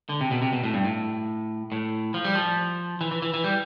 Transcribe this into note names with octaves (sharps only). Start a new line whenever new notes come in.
D3
C3
B2
C3
B2
A2
G2
A2
A2
F3
G3
F3
E3
E3
E3
E3
G3